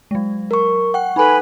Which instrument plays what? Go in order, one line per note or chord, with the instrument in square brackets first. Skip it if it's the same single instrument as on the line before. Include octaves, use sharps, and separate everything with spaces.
[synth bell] F#3 G#3
[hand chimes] A#4 C#6
[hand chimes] F#5 [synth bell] G5 C#6
[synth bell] D#4 A4 [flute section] B4 G#5 B5